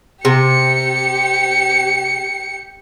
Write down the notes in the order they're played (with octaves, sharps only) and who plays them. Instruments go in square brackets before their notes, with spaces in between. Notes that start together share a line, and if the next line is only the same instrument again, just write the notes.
[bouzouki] C3 [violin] G4 C#7